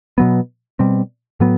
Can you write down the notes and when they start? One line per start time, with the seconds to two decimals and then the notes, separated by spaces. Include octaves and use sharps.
0.18 B2 F#3 B3
0.79 B2 G3 C4
1.40 A2 F#3 B3